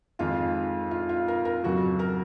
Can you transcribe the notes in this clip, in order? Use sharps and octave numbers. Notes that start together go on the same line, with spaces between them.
F2 D#3 G#3 F4
F4
F4
A#4
A#4
F2 C#3 F#3 F#4
A#4